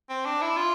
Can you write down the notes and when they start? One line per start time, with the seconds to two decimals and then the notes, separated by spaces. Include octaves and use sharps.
0.09 C4
0.26 D4
0.42 E4
0.57 F4